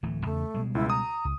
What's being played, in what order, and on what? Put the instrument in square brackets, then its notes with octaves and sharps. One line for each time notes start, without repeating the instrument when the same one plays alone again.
[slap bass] D1 E3 A3
[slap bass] E2 C#3 [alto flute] A3
[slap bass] B2 G3 G#3
[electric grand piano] C#2 [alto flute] E4
[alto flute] A#5 [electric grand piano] D#6
[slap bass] C#2